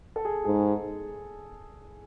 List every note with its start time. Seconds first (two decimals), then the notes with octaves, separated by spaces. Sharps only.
0.16 A4
0.25 G#4
0.44 G#2 G#4